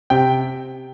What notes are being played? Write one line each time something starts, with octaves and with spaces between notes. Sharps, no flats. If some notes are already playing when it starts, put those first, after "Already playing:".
C3 G5